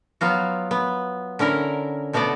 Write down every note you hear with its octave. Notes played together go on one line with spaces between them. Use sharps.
F#3 B3 F4 F#4
B3
D3 C#4 E4 A#4
B2 A3 B3 F#4 D5